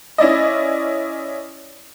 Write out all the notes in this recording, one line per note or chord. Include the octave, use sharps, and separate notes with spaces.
C#4 E4 D5 D#5